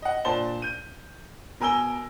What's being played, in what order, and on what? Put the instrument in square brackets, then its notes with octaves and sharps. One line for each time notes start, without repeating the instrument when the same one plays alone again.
[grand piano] D#5 F#5
A#2 D4 C5 A5 G7
G6 D#7
B2 A#4 G#5 E6 G7